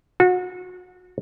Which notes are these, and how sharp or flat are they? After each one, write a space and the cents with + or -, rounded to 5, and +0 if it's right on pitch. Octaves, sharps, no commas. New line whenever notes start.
F#4 -30